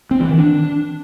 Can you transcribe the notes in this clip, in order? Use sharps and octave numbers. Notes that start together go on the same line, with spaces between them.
C4
E3
D#3
D4